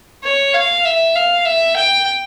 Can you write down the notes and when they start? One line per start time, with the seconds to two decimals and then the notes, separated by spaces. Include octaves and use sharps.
0.24 C#5
0.54 F5
0.85 E5
1.15 F5
1.45 E5
1.77 G5